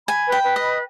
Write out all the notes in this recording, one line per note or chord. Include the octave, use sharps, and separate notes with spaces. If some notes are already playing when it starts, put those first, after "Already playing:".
G#5 B5
B4
G5
B4
D#5
B5